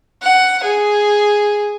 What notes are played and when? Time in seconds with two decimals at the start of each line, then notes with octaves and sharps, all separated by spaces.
0.22 F#5
0.64 G#4